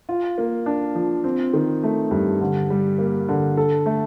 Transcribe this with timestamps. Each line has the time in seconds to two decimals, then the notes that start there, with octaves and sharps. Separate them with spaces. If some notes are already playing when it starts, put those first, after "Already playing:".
0.09 F4
0.38 A#3
0.66 D4
0.95 F3
1.24 C4
1.53 D#3
1.83 A3
2.11 G2
2.41 D3
2.70 G3
2.98 A#3
3.28 D3
3.57 A4
3.86 A3